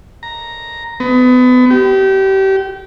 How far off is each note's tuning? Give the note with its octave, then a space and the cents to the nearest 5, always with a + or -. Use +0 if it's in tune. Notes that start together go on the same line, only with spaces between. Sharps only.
A#5 +0
B3 +30
G4 -25